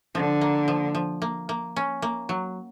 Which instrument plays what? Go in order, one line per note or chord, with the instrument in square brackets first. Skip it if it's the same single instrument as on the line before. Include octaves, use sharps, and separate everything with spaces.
[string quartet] D3 [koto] F3
[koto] A#3
F3
F3
A#3
A#3
C#4
A#3
F#3